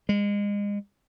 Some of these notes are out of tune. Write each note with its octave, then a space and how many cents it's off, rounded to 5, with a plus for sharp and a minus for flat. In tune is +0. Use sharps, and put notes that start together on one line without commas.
G#3 -30